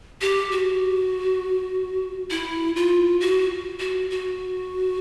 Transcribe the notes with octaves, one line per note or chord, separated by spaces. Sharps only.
G4
F#4
E4
F4
F#4
F#4
F#4